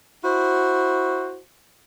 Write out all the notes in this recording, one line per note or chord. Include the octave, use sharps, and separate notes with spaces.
E4 F#4 C5